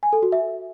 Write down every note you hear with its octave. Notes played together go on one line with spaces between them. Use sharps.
G#5
A4
F#4
E5